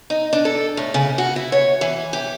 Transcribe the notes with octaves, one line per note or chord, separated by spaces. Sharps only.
D#4
D4
A4
A2
C#3
F#4
E4
C#5
E3
G4